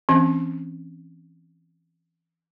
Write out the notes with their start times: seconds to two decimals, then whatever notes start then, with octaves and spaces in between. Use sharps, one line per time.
0.09 E3 C4 C#4